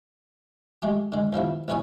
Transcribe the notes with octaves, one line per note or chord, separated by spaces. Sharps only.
G#3 A3 G4
D3 G#3
D#2 F3 B3 E4
B1 E3 B4 C#5 G#5 D#6